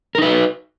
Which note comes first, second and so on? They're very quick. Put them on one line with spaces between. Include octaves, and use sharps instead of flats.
A#4 D#4 B4 F#4